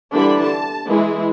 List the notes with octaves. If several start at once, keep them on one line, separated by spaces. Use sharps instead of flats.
D3 E3 G3 D4 B5
A5
E3 G#3 E4 G#4